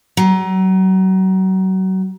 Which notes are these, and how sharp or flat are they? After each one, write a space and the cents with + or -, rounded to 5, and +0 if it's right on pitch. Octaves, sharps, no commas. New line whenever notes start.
F#3 +30